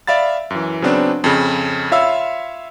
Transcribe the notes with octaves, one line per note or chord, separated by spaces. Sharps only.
D5 E5 F5 B5 A6
F#2 E3
C#3 F#3 B3 C4 D4
F2 C#3
F4 C#5 E5 F5 B5 E6